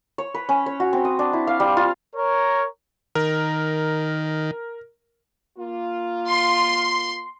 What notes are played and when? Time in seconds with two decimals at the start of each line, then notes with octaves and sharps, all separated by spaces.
0.18 C#5
0.34 B4
0.49 C#4
0.66 C#5
0.80 F#4
0.93 C4
1.05 D#6
1.19 D4
1.33 E4
1.47 F5
1.60 G3
1.77 F4
2.15 A#4 C#5
3.15 D#3 A#4
5.58 A#3 F4
6.28 C6